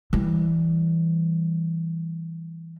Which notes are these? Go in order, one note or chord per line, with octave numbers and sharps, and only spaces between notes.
E3 G3